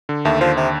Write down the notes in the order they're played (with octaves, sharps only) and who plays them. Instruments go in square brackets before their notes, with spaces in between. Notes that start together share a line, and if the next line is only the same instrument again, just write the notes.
[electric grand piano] D3
[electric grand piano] D#2 [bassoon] A3
[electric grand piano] D3 [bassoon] F3
[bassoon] C3